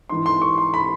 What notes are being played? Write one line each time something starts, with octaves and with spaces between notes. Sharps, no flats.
G#2 E3 C6
C6
C#6
C6
B5